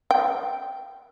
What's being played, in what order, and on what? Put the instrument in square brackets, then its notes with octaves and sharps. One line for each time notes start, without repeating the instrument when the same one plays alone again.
[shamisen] G5